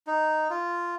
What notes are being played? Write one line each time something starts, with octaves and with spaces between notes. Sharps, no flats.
D#4
F4